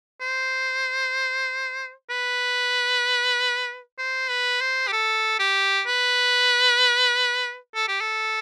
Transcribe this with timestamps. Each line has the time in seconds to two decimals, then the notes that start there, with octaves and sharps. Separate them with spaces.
0.21 C5
2.10 B4
3.99 C5
4.30 B4
4.61 C5
4.88 G4
4.93 A4
5.39 G4
5.87 B4
7.75 A4
7.88 G4
8.01 A4